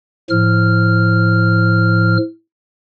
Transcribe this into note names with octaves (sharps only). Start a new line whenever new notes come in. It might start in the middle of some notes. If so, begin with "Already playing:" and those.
A2 F3 F6